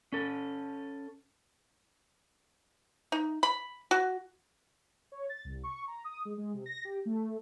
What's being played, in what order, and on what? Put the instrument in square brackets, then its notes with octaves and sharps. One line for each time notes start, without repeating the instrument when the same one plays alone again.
[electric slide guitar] C#4 A4
[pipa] D#4
B5
F#4
[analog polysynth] C#5
A6
C2
C#6
A#5
D#6
G#3
G#3
C3
A#6
G4
A3